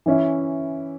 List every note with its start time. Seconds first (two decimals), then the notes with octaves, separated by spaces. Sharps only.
0.06 E3 C#4 E4